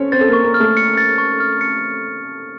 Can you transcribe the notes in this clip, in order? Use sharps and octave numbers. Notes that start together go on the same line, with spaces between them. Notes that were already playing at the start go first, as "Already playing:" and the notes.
Already playing: C#4 A4 C5 C#5
C4 C5 A6
A4
A#3 A#4
C#6
A#3 A#4
F6
A3 A4
C#7
A6
C#6
F6
C#7